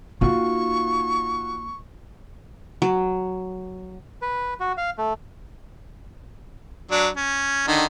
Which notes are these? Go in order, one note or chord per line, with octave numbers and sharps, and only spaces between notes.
A#3 D#4 F4 F#4 C#6
F#3
B4
F#4
F5
A3
F#3 D4
C#4
D3 D#3